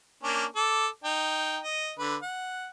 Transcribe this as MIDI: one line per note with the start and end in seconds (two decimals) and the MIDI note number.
0.23 0.45 58
0.23 0.45 61
0.23 0.45 62
0.56 0.87 69
0.56 0.87 86
1.04 1.58 63
1.04 1.58 79
1.63 1.92 75
1.99 2.16 50
1.99 2.16 71
2.23 2.69 78